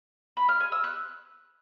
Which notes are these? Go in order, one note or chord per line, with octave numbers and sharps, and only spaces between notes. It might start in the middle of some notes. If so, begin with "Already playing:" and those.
B5
F6
G#5
E6
F#6